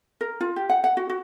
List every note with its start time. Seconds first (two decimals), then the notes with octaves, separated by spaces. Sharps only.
0.21 A#4
0.41 F4
0.56 G4
0.70 F#5
0.84 F#5
0.97 F#4
1.10 F#4